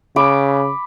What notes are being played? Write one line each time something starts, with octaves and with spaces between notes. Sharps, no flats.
C#3 B5 D6